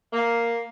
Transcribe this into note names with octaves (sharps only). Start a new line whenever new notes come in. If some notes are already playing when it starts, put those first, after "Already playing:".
A#3